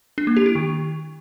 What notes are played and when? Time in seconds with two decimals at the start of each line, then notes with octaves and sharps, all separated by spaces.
0.18 D4
0.27 A#3
0.36 G4
0.46 E4
0.55 D#3